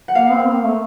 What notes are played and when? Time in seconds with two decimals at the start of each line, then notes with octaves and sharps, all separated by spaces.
0.08 F#5
0.15 A#3 F5
0.31 C4
0.48 A#3
0.64 A3